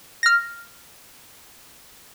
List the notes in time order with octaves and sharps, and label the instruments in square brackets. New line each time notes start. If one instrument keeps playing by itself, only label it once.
[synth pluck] F6 A#6